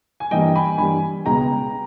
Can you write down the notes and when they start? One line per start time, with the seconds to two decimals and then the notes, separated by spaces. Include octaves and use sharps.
0.20 G#5
0.31 G2 E3 G3 A#3 D#5 G5
0.55 G#5 B5
0.78 G2 E3 G3 A#3 G#5 B5
1.25 C#2 B2 G#3 B3 G5 A#5